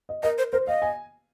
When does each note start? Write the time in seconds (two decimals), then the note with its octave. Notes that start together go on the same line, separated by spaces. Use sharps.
0.09 D#5
0.23 A#4 D#5
0.38 C5
0.52 A#4 C5
0.67 D#5 F5
0.82 G#5